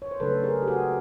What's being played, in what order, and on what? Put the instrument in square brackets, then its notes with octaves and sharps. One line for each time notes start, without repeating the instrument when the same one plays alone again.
[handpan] C#5
C5
C#3 F#3 A3 D4 A4 B4
G#4 A#4
G4
F#4 G#4